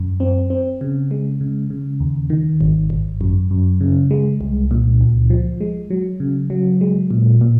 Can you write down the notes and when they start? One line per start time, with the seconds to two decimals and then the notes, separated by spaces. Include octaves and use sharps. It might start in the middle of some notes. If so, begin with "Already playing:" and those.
Already playing: F#2
0.20 C4
0.50 C4
0.81 C#3
1.11 G#3
1.41 C#3
1.70 C#3
2.00 D#2
2.30 D#3
2.61 G#1
2.90 G#1
3.21 F#2
3.51 F#2
3.81 C#3
4.11 G#3
4.41 C2
4.71 A#2
5.01 C#2
5.30 F3
5.61 G#3
5.90 F#3
6.20 C#3
6.50 F#3
6.81 G#3
7.11 A#2
7.41 A#2